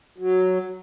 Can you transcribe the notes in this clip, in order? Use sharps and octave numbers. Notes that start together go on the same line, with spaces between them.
F#3